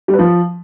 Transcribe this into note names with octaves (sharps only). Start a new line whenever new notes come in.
G3
B4
F3